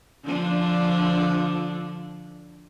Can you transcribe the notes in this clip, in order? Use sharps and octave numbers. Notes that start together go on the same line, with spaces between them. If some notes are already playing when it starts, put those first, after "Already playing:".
D3 F3 D4